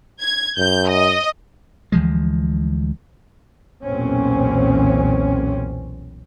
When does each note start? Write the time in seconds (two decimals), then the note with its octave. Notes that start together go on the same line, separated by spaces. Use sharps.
0.21 G#6
0.58 F#2 G6
0.88 D#5
1.92 D2 E3 F3 G#3
3.84 B1 E2 A#2 C4 C#4